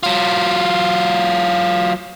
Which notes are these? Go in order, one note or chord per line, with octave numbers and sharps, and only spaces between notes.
F#3 F4